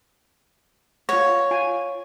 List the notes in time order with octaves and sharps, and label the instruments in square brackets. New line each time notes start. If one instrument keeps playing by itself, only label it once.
[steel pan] F4 F#5 [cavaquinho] C#5
[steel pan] F4 G#5